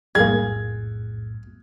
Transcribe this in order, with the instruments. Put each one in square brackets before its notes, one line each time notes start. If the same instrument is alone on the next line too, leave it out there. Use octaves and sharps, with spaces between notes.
[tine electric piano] B1 F2 A2 [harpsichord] G3 A#3 [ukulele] G#4 [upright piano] G#6